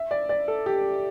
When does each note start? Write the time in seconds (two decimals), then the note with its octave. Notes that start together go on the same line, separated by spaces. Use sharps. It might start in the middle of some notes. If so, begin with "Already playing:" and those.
Already playing: E5
0.11 D5
0.29 D5
0.48 A4
0.66 G4